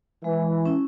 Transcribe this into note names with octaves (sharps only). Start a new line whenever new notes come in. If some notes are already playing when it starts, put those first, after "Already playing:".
E3 G#3
C#4 E4